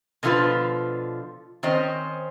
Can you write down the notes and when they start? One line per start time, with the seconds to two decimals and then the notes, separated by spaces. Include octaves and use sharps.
0.23 B2 D3 F3 F4 B4
1.63 D#3 C4 C#4 C5 D#5